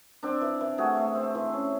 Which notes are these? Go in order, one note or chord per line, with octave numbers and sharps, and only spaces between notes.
C4 D4
E3
E3
A3 F#4 G#4
A3
C4
E3
C#4